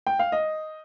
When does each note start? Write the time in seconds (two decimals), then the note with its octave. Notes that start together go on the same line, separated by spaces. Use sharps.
0.07 G5
0.19 F5
0.32 D#5